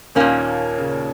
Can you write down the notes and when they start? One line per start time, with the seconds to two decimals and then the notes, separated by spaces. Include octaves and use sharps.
0.15 D#2 A#2 D#3 A#3 C#4
0.78 C#3